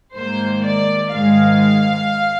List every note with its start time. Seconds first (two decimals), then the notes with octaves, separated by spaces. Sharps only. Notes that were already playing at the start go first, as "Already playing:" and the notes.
0.15 G#2 D#3 A#3 C5
0.64 D5
1.12 G#2 D#3 G#3 F5